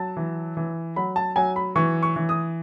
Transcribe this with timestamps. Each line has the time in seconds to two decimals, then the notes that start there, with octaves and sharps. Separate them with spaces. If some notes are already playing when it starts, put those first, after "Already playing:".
Already playing: F#3 A5
0.17 E3
0.57 E3
0.96 F#3 B5
1.16 A5
1.36 F#3 G#5
1.56 B5
1.76 E3 C#6
2.03 C#6
2.16 E3
2.29 D#6